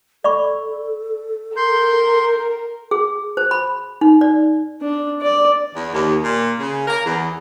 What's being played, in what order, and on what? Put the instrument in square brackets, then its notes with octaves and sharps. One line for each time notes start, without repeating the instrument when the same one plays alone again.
[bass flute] A4 [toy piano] D5 B5 C#6
[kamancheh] A#4 [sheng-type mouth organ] C6 G6
[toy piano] G#4
C5
B5
D#4
D5
[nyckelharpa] D4
D5
[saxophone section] E2
D#2
A#2
C#3
A#4
E2